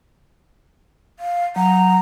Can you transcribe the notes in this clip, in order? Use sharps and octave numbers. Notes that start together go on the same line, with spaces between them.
F5
F#3 A#5